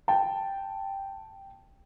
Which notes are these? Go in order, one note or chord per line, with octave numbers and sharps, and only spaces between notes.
G5 A5